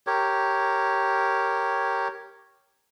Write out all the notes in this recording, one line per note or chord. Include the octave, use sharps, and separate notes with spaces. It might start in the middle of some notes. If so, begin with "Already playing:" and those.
G4 A#4 C#5